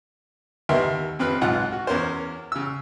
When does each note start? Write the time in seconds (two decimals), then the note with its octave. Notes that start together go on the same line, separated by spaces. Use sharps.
0.69 D#2 B3 A#4 E5 C6
1.19 F2 C4 B4 F6
1.41 B1 G#2 F4 F#5 F#6
1.72 F#4
1.87 E2 C#4 A#4 C5
2.52 C#3 E6